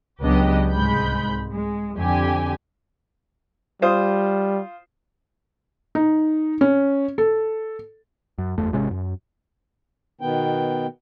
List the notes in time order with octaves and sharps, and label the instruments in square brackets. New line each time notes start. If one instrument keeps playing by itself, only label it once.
[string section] C#2 F#3 B3 D4 G4 D#5
C2 G#2 G#3 B5 G6
G#3
F2 D3 G4 G#5
[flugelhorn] G3 [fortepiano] F4 C5 D#6
[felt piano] D#4
C#4
A4
[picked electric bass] F#2
F#1 E2 A3
G#1 C3 G#3 C#4
F#2
[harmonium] B2 D#3 B3 G5